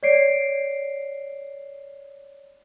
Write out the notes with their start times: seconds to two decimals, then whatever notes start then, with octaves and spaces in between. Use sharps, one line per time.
0.03 C#5 D5 C7 D7